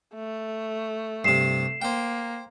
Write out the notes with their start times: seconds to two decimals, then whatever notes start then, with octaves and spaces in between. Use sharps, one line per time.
0.14 A3
1.24 G2 C3 C7 E7
1.82 A#3 C5 G5